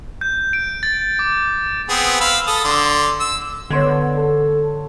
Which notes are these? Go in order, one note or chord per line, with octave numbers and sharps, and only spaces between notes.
G6
D7
A6
D6
B3 C4 G#4
F5 B5 E6
A4 D#6
D3 C6
E6
D3 B3 C#5 C6 G#6
A4